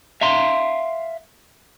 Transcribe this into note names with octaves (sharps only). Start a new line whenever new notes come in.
E5 F5 A#5 C6